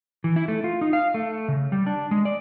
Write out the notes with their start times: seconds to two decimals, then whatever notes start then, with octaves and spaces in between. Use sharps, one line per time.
0.24 E3
0.36 E4
0.48 A3
0.64 F4
0.81 D#4
0.93 F5
1.14 A3
1.48 C#3
1.72 G3
1.86 D4
2.11 G#3
2.25 D5